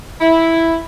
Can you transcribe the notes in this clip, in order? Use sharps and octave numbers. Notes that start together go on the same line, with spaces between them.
E4